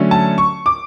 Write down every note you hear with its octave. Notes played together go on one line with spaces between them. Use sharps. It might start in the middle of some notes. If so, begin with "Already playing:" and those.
Already playing: D3 F#3 A3 C#4
A5
C#6
D6